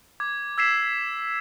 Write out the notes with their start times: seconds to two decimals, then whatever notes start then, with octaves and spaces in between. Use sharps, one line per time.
0.20 D6 G#6
0.58 E6 G#6 B6 C7 E7